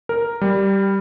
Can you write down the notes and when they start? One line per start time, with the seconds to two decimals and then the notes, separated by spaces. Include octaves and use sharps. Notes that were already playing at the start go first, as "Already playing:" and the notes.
0.09 A#4
0.41 G3